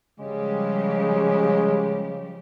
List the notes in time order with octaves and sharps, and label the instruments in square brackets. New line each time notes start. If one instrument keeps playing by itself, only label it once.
[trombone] C#3 [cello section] F3 G3 G4 [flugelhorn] G#3